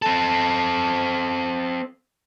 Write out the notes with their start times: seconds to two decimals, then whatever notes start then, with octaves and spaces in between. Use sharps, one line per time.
0.02 C4 A4